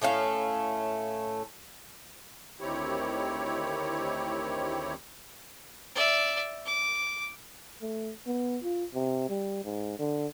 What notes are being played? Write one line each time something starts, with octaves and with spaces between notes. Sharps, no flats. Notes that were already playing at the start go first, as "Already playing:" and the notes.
A2 A3 C#4 F5
D2 D#3 C4 E4 G4 C#5
D5 E5
D6
A3
B3
F4
C3
G3
G#2
D3